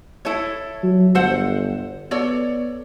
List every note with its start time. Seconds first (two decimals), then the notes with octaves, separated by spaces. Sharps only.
0.25 E4 A4 C#5
0.83 F#3
1.15 G1 A4 C5 F#5
2.11 B3 A4 C#5 D5